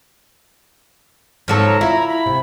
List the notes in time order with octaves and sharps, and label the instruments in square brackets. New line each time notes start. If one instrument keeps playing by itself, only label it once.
[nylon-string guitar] G#2 [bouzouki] F3 F#3 A4
[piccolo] A#5
[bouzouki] E4 [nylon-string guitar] F4
[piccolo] B5
[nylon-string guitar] C3